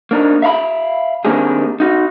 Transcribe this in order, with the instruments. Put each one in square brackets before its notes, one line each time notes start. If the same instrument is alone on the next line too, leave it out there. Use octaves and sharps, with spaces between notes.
[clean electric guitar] A#3 D4 D#4
E5 F5 A#5 B5
D#3 A#3 C4 D4 G4 G#4
D#4 F#4